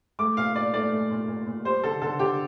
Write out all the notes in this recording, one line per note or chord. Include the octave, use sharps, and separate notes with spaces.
A3 D6
A#2 F5
A#2 D5
A3 D5
A3
A#2
A#2
A#2
G3 C5
D3 A4
D3 A4
D3 G4